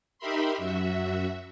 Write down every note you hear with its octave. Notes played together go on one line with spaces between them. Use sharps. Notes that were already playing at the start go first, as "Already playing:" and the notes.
D#4 G4 A#4 E5 B5 C6
F#2 F#4 E5